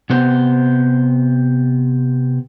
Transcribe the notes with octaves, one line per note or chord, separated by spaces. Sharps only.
C3 B3 C5